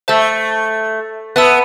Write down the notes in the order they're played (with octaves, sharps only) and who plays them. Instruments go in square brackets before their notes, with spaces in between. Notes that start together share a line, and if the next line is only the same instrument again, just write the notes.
[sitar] A3 [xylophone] C5 E5 A5 E6 G6
[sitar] B3 [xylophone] E5 A5 E6